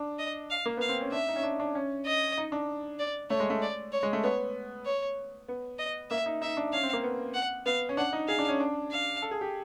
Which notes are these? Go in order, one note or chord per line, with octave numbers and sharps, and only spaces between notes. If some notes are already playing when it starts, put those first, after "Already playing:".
Already playing: D4
D#5
F5
A#3
B3 F5
C4
C#4
D4 E5
D#4
C#4
D4
D4
C#4
D#5
D#4
D4
D5
A3 C#5
G#3
A3
D5
C#5
G#3
A3
B3 C#5
C#5
B3
D#5
A#3 E5
D#4
D#4 E5
D4
C#4 F5
C4
A#3
B3
F#5
B3 F5
C#4
D4 F#5
D#4
G#4 F5
D4
C#4
D4
F5
A4
G#4
G4